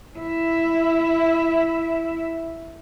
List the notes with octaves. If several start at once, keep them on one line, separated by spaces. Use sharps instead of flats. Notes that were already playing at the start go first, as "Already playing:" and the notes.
E4 E5